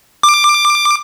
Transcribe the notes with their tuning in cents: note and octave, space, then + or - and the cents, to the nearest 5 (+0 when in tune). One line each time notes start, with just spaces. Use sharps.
D6 +15